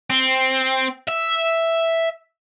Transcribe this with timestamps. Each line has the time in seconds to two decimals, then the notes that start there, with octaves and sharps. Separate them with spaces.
0.10 C4
1.08 E5